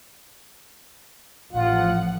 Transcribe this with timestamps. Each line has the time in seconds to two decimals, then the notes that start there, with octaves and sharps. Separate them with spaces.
1.53 A1 F3 F4 F#5